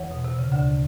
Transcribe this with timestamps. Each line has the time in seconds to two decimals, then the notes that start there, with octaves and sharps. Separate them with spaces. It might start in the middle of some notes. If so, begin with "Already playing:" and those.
Already playing: E2 E3 C#5 F#5
0.11 B2
0.25 C3
0.39 C#3
0.52 D2 D3